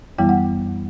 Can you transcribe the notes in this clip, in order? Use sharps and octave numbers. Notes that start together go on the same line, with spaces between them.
F#2 E3 G3 B3 E4 G5
F#5